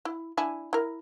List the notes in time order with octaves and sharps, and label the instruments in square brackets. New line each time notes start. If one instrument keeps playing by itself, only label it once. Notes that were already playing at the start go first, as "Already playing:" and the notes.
[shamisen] E4
D4 E4 G#5
E4 A#4